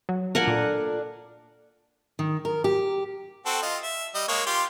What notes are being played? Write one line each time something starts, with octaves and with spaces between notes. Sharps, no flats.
F#3
D4 F4 A4 A#4 F#5 G#5
A#2
D#3
A#4
G4
C4 F#4 A4
F4 D#5
E5
G3 D#5
G#3 A#3 C#5
F4 G4 C6